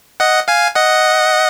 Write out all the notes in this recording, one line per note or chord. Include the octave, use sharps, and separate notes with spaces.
D#5 F#5
F5 G#5
D#5 F#5